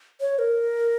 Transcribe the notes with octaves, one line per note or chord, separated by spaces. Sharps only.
C#5
A#4